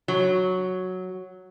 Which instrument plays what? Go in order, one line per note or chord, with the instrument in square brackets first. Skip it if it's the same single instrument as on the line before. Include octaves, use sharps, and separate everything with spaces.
[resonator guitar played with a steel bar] F#3